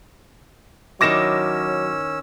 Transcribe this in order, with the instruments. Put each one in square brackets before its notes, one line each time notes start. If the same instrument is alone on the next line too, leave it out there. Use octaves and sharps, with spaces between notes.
[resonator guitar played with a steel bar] D#3 E4 [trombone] F#3 [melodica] C#4 E6 [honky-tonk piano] D6 A#6 E7